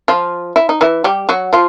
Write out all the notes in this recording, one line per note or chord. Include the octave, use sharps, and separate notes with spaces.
F3 F4
E4
D#4
E3 E4
G3 G4
F#3 F#4
F3 F4